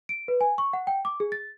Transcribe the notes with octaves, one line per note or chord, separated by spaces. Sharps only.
D7
B4
G#5
C#6
F#5
G5
D6
G#4
A6